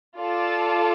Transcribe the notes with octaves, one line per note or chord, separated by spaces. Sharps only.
F4 A4 D5 A5